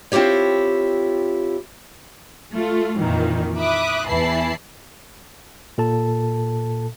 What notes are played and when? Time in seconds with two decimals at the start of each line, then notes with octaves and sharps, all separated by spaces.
0.12 C4 E4 F4 G4 C#5
2.53 A3 F4
2.99 F2 A#2 D#3 E3
3.58 E5 B5 D6 D#6 F#6
4.08 E2 E3 E4 A5 B5 C7
5.78 A#2 A4 A5